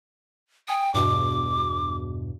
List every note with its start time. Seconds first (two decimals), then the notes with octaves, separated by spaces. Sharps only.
0.68 G5 G#5 D#6
0.94 E2 G2 B2 D6